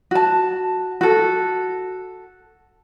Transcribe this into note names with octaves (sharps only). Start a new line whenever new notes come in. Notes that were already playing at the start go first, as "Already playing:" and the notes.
F#4 A5
F#4 A4